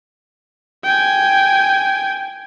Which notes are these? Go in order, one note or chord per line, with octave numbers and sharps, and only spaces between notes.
G5 G#5